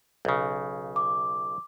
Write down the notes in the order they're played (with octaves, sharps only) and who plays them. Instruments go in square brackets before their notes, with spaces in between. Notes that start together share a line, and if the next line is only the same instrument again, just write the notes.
[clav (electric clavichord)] B1 C#3
[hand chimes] D6